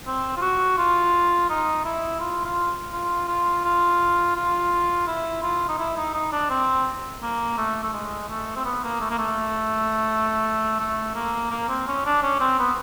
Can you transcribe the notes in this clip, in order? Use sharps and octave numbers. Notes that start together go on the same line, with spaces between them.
C4
F4
F#4
F4
D#4
E4
F4
F4
F4
F4
F4
F4
E4
F4
D#4
E4
D#4
D#4
D4
C4
A#3
A3
A3
G#3
A3
C4
B3
A#3
A3
A#3
A3
A3
A#3
A#3
C4
C#4
D4
C#4
C4
B3